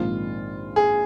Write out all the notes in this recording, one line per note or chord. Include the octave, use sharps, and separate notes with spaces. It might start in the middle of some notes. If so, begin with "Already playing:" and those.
Already playing: A#1 G#2 D#3 G#3 C4 F4
G#4